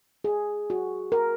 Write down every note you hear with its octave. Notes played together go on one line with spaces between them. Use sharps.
G#4
F#4
A#4